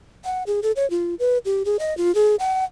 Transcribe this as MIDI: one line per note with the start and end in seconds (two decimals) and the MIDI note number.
0.25 0.43 78
0.47 0.60 68
0.63 0.72 69
0.76 0.88 73
0.90 1.15 65
1.19 1.38 71
1.45 1.63 67
1.65 1.77 68
1.79 1.96 75
1.97 2.14 65
2.15 2.36 68
2.40 2.64 78